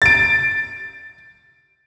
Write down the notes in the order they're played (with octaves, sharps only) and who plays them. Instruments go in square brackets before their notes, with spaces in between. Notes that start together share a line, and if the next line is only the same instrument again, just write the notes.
[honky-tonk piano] A6 D7